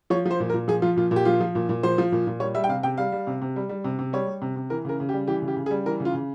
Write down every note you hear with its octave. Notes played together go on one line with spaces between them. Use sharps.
F3 C#5
F3
C5
A#2
A#4
A#2
F3 G#4
F3 F4
A#2 F4
A#2
G4
F3 F4
F3
A#2
A#2
F3 C5
F3
A#2
A#2
G3 C#5
G3 E5
G5
C3 F5
C3 G5
G3 F5
G3
C3
C3
G3
G3
C3
C3
G3 C#5
G3
C3
C3
E3 A#4
C#3 A#4
C#3
G4
G3
E3 G4
C#3
G4
C#3
G#4
G3
E3 A#4
C#3
F4
C#3